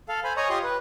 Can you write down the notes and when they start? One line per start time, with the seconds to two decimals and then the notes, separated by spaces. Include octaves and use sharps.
0.09 A4 F5
0.24 C5 G#5 B5
0.37 C#5 D#5 G#5 A#5 C#6 D#6
0.49 F4 G4 D#5 C6 D#6
0.64 B4